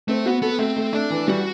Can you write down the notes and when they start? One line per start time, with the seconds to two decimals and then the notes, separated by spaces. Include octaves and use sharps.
0.08 A3 C4
0.26 B3 F#4
0.42 B3 A4
0.59 A3 C4
0.76 A3
0.93 A3 D4
1.10 E3
1.28 G3 F#4